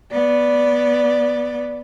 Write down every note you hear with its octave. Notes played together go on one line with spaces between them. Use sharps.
B3 D5